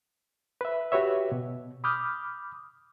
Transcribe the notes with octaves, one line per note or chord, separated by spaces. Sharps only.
B4 E5
F#4 G4 B4 C#5 E5
B2
B5 D6 D#6 F6 G6